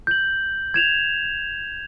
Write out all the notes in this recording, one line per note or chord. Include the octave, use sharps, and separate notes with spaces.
G6 F#7
G#6 E7 F7